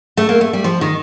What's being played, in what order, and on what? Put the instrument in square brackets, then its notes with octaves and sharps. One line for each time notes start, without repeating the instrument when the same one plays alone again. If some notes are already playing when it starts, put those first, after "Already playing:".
[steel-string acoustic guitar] A3
A#3
A3
G3
F3
D#3